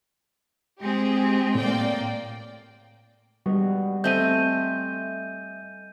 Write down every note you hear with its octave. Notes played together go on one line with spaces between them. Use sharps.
G#3 C4 G4 G#4
A2 A#3 D5 G5
G3 G#3 B3 F#4
A3 C4 D#5 E5 G#5 G6 D#7